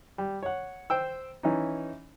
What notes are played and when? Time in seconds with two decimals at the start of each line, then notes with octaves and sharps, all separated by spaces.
0.18 G3
0.43 C#5 F#5
0.90 C5 G5 E6
1.43 E3 C#4 D#4